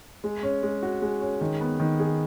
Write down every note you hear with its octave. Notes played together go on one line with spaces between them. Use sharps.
G#3
C#4
G#3
F#4
G#3
C#4
D#3
B3
D#3
G#4